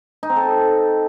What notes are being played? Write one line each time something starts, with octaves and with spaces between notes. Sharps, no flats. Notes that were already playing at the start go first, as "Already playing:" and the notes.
D#4
C4
A4